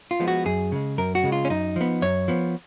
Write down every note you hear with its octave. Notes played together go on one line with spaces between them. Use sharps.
F4
F3 G#3 B3
F#4
F#2 G#4
C#3 G#3
F#2 A#4
F#4
C#3 G#3
F4
C#4
F#2 D#4
F3 B3
F#2 C#5
F3 B3